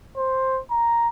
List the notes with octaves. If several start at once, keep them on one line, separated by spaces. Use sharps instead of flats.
C5
A#5